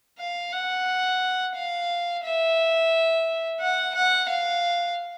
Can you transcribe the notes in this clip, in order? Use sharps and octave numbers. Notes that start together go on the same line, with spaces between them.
F5
F#5
F5
E5
F#5
F#5
F5